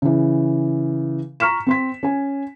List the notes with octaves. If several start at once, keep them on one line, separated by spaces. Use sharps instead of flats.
C#3 E3
A#5 C#6 F6 B6 E7
C4 C6 B6
C#4 G#5